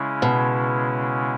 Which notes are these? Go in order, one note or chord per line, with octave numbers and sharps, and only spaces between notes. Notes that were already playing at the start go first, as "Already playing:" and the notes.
Already playing: C#3 G#3 C#4 E4
B2